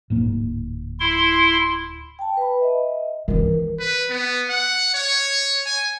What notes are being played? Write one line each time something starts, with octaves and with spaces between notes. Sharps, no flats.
D1 G#2 A#3
E4 C6
G5 A5
B4 B5
D#5 E5
D#3 E3 A#4
B4
B3
F#5
C#5
G#5